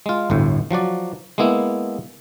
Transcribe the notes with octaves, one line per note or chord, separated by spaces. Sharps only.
G#3 F4
G1 D2 A2
F3 F#3 F#4 D5
G#3 A#3 B3 E4